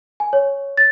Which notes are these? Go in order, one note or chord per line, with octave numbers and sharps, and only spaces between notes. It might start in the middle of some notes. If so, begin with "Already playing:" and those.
G#5
C#5
A6